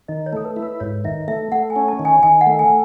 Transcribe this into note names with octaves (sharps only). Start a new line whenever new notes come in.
D#3 D#5
C#5
A3 A4
B4
E4
B4
G#2 C#5
D#3 E5
A3 E5
A3 F#5
G#5
C#4
A5
D#3
G#5
D#3 G#5
F#5
A3
G#5